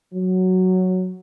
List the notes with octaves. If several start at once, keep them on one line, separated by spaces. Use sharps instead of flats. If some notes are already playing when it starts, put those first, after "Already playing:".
F#3